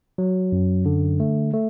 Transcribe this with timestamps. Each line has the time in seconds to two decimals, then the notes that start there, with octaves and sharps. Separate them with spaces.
0.18 F#3
0.52 F#2
0.86 D3
1.20 A3
1.53 A3